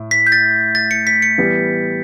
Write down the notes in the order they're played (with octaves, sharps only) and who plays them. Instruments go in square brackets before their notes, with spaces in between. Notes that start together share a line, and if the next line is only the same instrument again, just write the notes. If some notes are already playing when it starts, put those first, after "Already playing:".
Already playing: [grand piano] A2
[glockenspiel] B6
G6
A6
A6
C#7
B6
C#7
[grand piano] E3 G3 B3